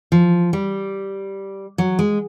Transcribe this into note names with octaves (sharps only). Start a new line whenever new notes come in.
F3
G3
F#3
G#3